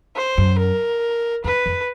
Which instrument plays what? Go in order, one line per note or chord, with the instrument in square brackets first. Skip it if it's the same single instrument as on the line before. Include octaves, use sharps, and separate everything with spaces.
[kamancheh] C5
[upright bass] F#2
[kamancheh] A#4
[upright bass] F2 [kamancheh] B4
[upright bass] F2